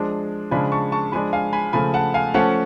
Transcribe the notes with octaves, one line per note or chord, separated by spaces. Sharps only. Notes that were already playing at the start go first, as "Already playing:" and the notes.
Already playing: F3 G#3 D4
C#3 F3 G#3 D4 G#5 B5
A5 C#6
A5 C#6
F3 G#3 D4 G#5 B5
F5 G#5
G#5 B5
C#3 F3 A3 G#5 B5
F#5 A5
F5 G#5
F3 A3 C#4 F#5 A5